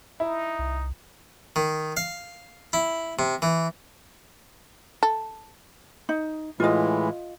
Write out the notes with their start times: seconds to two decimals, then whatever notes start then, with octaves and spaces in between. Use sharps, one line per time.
0.20 D#4 E4
0.59 C2
1.56 D#3
1.97 F5
2.73 E4
3.19 C3
3.42 E3
5.03 A4
6.09 D#4
6.60 A2 E3 G#3 F4 D#5